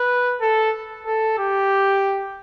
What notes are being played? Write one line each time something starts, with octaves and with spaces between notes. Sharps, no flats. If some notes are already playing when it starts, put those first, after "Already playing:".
Already playing: B4
A4
A4
G4